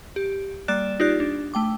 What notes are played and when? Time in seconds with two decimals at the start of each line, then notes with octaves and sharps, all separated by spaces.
0.16 G4
0.68 G3 A#3 D5 F#6 A6 E7
1.00 D#4 F4 G4 D5 F#6
1.20 D4
1.54 A3 G5 D6